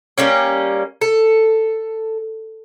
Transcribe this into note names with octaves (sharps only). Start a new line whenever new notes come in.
G3 A#3 C#4
A4